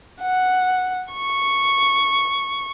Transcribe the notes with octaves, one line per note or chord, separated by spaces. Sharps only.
F#5
C#6